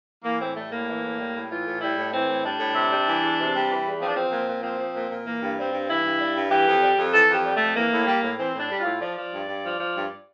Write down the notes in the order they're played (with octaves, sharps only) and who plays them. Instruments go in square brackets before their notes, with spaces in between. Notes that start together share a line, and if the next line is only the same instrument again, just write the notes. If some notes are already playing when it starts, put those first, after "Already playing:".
[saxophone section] E3 A#3
A2 C4
G3 A3
A2 A#3
E3
A2
G3
A2
E3 F4
A2
G3 E4
A2
E3 C4
A2
G3 D4
A2
C3
G3
E3
E2
C3
G3
E3
E2
F3 C4
D4
F3 C4
A#2
A#2
F3 C4
F3
A#2
A#2
E3 A#3
G2
G3 C4
G2
E3 E4
G2
G3
G2
E3 G4
F2
G3
F2
E3 A4
F2 G4
G3
F2 A3
E3 A#3
A2
G3
A2
E3 C4
A2 D4
G3
F4
A2
F3 D5
F3
G2
G2
F3
F3
G2